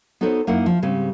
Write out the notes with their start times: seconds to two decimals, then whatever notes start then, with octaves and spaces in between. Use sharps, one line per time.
0.21 B3 D#4 F#4 A4 C5 C#5
0.47 F#2 A#3 D#4 E4 A#4 F#5
0.66 F3
0.82 G#2 C#3 G3 C4